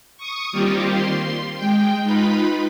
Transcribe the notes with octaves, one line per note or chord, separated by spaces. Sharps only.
C#6 D#6
D#3 G3 A#3 C4 F4 G4
C6
G#3 G5
D#4 F4 B4 B5